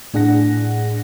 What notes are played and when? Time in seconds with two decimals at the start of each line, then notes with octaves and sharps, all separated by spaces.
0.13 A2 D4 G#4 F#5 A#6